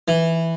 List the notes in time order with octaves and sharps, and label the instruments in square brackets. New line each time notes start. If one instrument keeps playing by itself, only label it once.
[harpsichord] E3